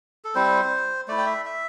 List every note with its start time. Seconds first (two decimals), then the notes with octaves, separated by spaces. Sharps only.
0.24 A4
0.35 G3 C4 E4 C5
1.08 A3 E4 D5
1.18 G5
1.26 E5
1.45 E5